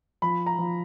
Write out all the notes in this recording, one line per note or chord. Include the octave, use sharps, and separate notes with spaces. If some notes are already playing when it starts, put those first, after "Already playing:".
F3 B5
A#5
F3